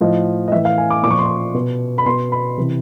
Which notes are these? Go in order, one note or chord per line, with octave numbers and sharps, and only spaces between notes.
A2 F3 D#5
D#5
A2 E3 E5
F5
G#5
D6
A#2 F3 C#6 D6
C6
C#6
B2
B5
B2 C6
B5
C3 E3